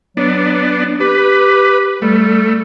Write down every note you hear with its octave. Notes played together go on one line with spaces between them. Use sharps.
F#3 B3 D4
G4 B4
G3 A3